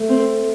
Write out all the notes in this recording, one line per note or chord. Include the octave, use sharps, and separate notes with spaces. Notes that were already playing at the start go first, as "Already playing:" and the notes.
Already playing: A3
C4